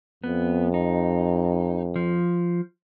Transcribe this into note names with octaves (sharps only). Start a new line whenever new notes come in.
F2 B3
D#4
F3